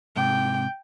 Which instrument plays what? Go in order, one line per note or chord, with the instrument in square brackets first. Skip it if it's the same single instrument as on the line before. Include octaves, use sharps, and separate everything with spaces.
[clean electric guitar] G#2 C3 [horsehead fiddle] G5